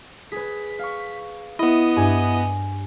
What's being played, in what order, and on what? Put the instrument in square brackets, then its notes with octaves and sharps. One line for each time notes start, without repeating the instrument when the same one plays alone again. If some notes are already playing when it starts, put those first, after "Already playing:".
[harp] G#4 B4 [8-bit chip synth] B6
[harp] F5 C#6
[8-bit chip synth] B3 D#5 [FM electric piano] E4
[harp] G2 G4 G#5